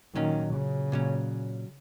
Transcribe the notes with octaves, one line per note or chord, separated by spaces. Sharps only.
A#2 D#3 F#3 C#4
C#3
A#2 F#3 C#4